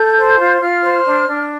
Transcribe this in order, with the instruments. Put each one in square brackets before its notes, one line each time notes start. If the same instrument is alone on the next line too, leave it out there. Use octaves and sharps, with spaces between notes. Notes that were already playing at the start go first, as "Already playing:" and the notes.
Already playing: [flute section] A4 G6
C5
F4
F4 F6
C5
D4
D4